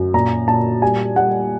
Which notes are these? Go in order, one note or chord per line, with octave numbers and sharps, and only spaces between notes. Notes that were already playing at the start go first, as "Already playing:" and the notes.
Already playing: F#2
A#2 A#5
A#2 A5
G3 G#5
G3 F#5